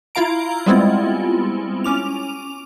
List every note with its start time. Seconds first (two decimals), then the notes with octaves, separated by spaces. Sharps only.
0.15 E4 F4 F5 A#5 D7
0.66 G3 G#3 B3 C4 E4 F4
1.84 C#4 D6 F7